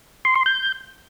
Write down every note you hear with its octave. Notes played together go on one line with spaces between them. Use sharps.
C6
C6
G6